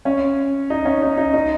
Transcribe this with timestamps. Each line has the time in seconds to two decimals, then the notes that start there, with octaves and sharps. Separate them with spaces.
0.05 C#4
0.70 D#4
0.85 C#4
1.02 D#4
1.17 D#4
1.34 D#4